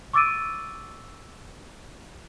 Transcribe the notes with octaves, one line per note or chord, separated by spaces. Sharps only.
C#6 D6 E6 A6 D7 D#7